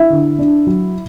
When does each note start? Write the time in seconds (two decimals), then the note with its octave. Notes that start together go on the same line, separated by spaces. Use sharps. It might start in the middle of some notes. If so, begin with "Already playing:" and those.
Already playing: E4 E5
0.10 D3
0.39 D4
0.67 F#3